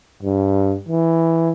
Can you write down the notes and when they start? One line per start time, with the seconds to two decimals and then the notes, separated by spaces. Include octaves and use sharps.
0.23 G2
0.89 E3